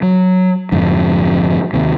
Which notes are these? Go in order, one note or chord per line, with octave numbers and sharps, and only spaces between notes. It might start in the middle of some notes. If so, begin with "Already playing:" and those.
F#3
F1 F2 G#2 D3
D#2 C3